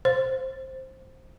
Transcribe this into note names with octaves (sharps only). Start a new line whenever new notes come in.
C5